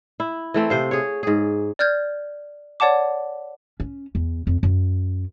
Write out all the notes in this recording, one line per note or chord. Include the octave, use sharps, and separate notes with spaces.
E4
E3 A3 C4
C3 C5 F5
G#4 C#5
G#2 G#4
D5 F6 G6 G#6
C#5 D5 F#5 A5 D6
C#4
E2
F2
F#2